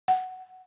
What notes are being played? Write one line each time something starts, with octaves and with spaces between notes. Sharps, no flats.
F#5